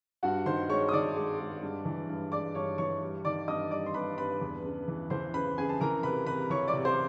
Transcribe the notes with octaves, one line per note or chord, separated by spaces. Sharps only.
G2 F#4 F#5
D#3 C5 C6
G#3 C#5 C#6
D#6
D#3 D5 D6
G#3
G#3
G2
E3
G2
G#3 D5 D6
G2 C#5 C#6
E3 C#5 C#6
G3
D#3 D5 D6
G2 D#5 D#6
G3 D5 D6
C6
G2 B4 B5
G2 B4 B5
E2
C#3
E3
E3 C5 C6
C#3 B4 B5
C#3 G#4 G#5
A5
E3 A#4 A#5
C3 B4 B5
C3 B4 B5
E3 C#5 C#6
D5 D6
C3
C5 C6